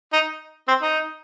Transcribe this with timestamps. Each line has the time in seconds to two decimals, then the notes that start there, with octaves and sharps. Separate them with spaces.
0.13 D#4
0.68 C4
0.82 D#4